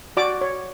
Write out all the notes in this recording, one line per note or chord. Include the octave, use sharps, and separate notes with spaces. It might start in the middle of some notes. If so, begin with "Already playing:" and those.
F#4 D5 D6
C#5